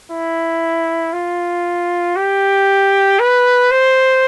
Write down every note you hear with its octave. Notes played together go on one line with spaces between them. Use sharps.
E4
F4
G4
B4
C5